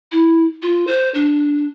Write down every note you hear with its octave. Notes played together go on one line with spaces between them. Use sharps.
E4
F4
C5
D4